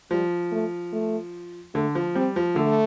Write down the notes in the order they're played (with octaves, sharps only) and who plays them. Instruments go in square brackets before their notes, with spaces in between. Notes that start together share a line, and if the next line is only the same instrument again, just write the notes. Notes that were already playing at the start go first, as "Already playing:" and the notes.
[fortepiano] F3 [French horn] G3
[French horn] A3
A3
[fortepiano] D3 [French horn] A3
[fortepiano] F3
[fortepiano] G3 [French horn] C4
[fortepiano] F3
[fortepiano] D3 [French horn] A3